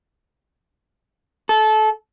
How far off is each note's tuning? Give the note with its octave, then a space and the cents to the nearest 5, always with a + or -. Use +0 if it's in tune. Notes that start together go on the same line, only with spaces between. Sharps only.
A4 -25